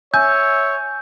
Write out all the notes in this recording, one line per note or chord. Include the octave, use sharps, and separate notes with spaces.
C#5 E5 G#5 G6